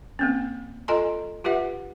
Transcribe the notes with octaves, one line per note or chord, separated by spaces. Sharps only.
A#3 C4 C#4
F4 A4 D#5 G#5 A#5 C6
F4 G4 B4 E5 F#5